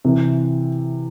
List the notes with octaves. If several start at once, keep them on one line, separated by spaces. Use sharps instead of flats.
C3 E3